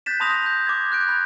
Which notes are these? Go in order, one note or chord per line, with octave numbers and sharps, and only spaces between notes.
F#6 G6 A6 B6 E7
A5 B5 C6 D#6 A#6 F7
G6
D6 G#6
F#6 G6 D7
B5 F#6 G6